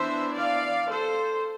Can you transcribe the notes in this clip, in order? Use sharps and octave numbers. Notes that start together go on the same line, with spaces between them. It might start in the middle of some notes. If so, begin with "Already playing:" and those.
Already playing: E3 B3 D4 C5 E5
D5 F5
A4 C5